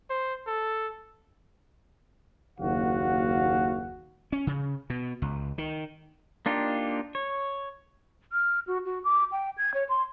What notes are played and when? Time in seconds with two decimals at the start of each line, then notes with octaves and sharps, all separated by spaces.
0.10 C5
0.47 A4
2.59 F#1 D#2 F#4 F5 F#5
4.32 C#4
4.47 C#3
4.90 B2
5.22 C#2
5.58 D#3
6.46 A#3 D4 D#4 F4 G4
7.15 C#5
8.32 F6
8.67 F#4
8.85 F#4
9.04 D6
9.32 G5
9.58 G#6
9.74 C#5
9.89 C6